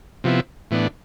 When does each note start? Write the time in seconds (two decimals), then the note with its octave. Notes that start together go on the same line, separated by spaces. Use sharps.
0.24 C3 F3 B3 E4
0.71 A2 E3 B3 D4